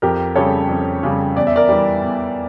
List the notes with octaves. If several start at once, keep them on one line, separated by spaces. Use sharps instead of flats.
F2 G4 A#4
C#3 G3 A4 C#5
F2
C#3 G3
E2 D5
E5
A#4 D5
E3 G3
E2